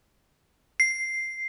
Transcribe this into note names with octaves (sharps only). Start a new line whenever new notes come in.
C7